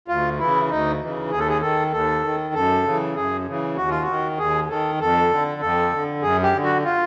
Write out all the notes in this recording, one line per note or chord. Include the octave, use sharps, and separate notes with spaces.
D2 F4
C#3 E3 E4
D2 D#4
C#3 E3
D#2 G#4
A4
G#4
D#3 A4
D#2 A4
D#3
F#2 A4
C#3 E3
F#2 G#4
C#3 E3
D#2 F#4
F4
F#4
D#3
D#2 G#4
D#3 A4
F2 A4
D3
F2 A4
D3
F#2 G#4
G4
D3
F#4
F4